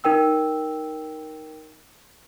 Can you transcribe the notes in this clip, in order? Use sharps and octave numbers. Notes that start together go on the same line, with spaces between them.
D#4 A#4 G5 E6